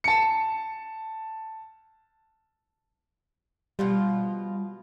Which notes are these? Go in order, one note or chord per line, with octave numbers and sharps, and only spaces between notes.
A5 C#7
B2 F3 G3 F4